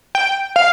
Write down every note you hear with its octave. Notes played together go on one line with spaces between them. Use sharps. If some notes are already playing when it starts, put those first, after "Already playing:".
G5
F5